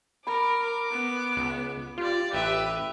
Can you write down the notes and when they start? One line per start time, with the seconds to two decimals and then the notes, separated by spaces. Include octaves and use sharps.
0.27 A#4 B5 D6
0.91 B3
1.37 C#2
1.98 F4 G4 D5
2.33 A1 G4 B4 E5